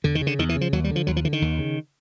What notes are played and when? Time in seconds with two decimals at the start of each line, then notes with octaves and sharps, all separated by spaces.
0.04 E2 D3
0.15 D#3
0.21 C#3
0.27 D3
0.39 E2 D#3
0.49 E3
0.55 C#3
0.61 F3
0.73 D#2 F#3
0.84 G3
0.90 D3
0.96 F3
1.07 D#2 F#3
1.16 F3
1.25 D3 E3
1.33 D#3
1.42 D#2
1.59 C#3